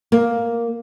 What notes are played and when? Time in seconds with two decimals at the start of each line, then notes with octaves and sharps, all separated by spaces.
0.12 A#3